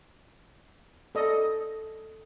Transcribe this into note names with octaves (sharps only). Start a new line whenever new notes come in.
A4 D5 D#5